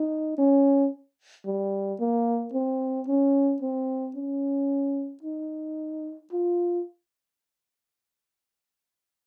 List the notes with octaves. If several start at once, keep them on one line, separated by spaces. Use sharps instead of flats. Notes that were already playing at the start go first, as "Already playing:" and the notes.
Already playing: D#4
C#4
G3
A#3
C4
C#4
C4
C#4
D#4
F4